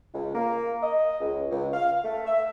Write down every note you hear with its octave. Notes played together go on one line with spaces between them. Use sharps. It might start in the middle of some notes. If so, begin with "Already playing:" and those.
C#2
A#3
D#5
C#2
C#2
F5
A3
E5